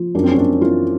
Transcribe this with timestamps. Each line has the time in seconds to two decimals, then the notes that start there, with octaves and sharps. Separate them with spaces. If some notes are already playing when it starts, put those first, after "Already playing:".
Already playing: F3
0.15 F#2 D4
0.24 C4
0.31 C#4
0.38 F#2 D4
0.62 E3 F4